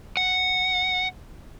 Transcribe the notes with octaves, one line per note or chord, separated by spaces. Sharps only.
F#5